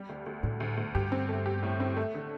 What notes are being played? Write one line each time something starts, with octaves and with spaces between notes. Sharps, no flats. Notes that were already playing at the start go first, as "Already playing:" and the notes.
Already playing: G3
D2
D2
A2 D3
D2
D2
G2 G4
C4
A3
G4
A2
C4
A3
D3